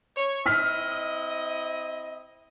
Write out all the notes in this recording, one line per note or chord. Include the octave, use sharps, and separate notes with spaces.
C#5
C4 E4 D#5 E6 F6 B6